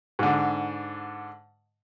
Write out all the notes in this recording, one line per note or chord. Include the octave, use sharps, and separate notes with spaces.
G#2 D3